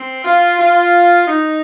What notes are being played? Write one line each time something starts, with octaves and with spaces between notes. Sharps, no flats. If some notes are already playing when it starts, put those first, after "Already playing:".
Already playing: C4
F4
F4
D#4